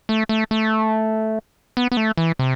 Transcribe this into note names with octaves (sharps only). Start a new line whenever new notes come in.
A3
A3
A3
B3
B3
A3
E3
C3